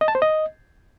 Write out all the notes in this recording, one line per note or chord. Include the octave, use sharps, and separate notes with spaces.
D#5
A5
C5
D#5